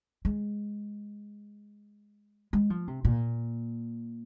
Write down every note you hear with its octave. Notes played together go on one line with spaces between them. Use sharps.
G#3
G#3
F3
C3
A#2